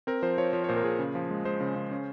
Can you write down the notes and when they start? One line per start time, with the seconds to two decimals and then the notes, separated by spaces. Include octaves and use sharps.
0.07 C4 A#4
0.23 F3 C5
0.38 F3 C#5
0.53 F3 C#5
0.64 C#5
0.69 A#2 C5
0.76 A#4
0.83 A#2 G#4
0.99 C#3
1.15 F3
1.31 G#3
1.45 G#3 C5
1.61 C#3
1.76 C#3
1.91 C#4